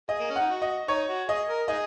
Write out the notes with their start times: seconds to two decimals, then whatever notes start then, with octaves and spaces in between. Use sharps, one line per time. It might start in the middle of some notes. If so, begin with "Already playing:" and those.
0.09 G#4 D#5
0.20 A#3
0.30 C#4
0.36 D#4 F#5
0.49 F#4
0.62 D#5
0.88 D#4 C#5
1.09 F#4
1.29 G#4 D#5
1.49 A#4
1.68 D#4 G#4 D#5